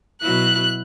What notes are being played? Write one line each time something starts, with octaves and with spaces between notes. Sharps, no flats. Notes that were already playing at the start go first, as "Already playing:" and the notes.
B2 F#3 E4 F#6